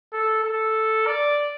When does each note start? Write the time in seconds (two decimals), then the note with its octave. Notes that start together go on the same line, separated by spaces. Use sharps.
0.13 A4
0.44 A4
1.06 D5